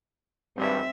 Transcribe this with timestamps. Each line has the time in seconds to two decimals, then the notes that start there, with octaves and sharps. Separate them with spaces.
0.57 G#1 G2 C4 E5